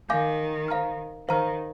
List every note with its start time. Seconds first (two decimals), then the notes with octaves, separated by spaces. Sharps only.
0.09 D#3 F5 G#5 D6 G6
0.68 C5 F5 A#5 F6
1.28 D#3 C5 F5 A#5 F6